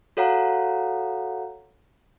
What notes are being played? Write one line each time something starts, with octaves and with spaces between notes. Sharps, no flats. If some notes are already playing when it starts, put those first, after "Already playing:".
F#4 A4 C#5 F5 F#5 A#5